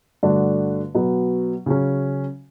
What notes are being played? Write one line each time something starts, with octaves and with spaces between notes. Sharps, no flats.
G2 D3 A3 D4 F#4
B2 F#3 B3
C#3 F#3 C#4